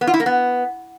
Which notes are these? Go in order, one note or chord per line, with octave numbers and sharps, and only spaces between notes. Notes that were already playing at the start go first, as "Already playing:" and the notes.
B3
F4
E4
A#3
B3